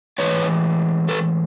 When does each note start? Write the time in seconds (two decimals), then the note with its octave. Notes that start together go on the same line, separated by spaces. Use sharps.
0.18 A2 E3 G#3 B4 C#5
1.09 A4 B4